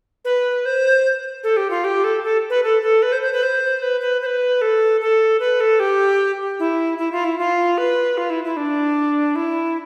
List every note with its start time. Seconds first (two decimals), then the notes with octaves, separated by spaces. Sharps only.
0.25 B4
0.66 C5
1.44 A4
1.57 G4
1.70 F4
1.84 G4
2.04 A4
2.24 A4
2.50 B4
2.64 A4
2.82 A4
3.03 B4
3.12 C5
3.22 C5
3.33 B4
3.43 C5
3.82 B4
4.01 B4
4.22 C5
4.26 B4
4.62 A4
5.01 A4
5.40 B4
5.60 A4
5.80 G4
6.59 E4
6.98 E4
7.12 F4
7.24 E4
7.39 F4
7.78 B4
8.18 F4
8.30 E4
8.44 E4
8.57 D4
9.36 E4